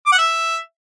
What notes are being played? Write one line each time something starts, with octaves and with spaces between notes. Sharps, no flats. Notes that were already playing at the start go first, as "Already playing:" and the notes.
D6
F#5
E5